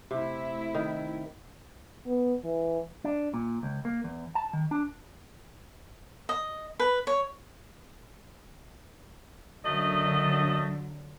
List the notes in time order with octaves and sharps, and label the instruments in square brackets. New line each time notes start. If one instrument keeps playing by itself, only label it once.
[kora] C3 [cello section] A3 E4
[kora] D#3
[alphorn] B3
E3
[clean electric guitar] D4
A#2
C#2
A#3
E2
A5
D#3
D4
[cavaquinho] D#5
B4
C#5
[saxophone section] F#2 A3 D#5 [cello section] D3 F#3